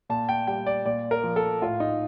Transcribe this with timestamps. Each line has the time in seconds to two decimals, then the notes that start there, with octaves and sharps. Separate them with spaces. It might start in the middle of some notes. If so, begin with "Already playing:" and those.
0.09 A#2 A5
0.29 G5
0.47 G3 G5
0.67 D5
0.85 A#2 D5
1.11 A#4
1.23 F3
1.36 A4
1.62 A2 F4
1.80 D#4